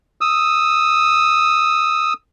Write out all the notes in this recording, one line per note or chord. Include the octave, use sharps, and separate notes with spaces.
D#6 E6